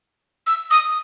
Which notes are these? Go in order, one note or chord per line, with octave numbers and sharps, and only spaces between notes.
E6
D#6